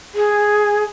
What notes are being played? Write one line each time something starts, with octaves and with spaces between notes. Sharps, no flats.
G#4